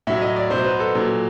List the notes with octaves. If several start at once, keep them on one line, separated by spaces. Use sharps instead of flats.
A2 F#3 E5
D#5
D5
B2 F#3 C5
B4
A4
A#2 F#3